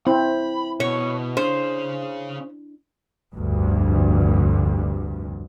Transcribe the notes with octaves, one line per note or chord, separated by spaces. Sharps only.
C4 E4 B5
B2 C#5
C#4 D4 G#4 C5
F1 D2 G2